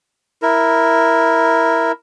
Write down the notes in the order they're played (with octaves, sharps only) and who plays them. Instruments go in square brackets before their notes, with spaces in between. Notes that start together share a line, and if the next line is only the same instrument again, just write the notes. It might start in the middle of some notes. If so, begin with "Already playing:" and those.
[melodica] E4 A#4